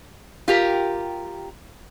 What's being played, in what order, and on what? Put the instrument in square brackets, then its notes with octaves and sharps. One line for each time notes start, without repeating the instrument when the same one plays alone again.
[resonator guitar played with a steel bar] F4 G4 A#4